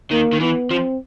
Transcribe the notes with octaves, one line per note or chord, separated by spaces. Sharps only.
D#3 A#3
D#3
E3 B3
F3 C4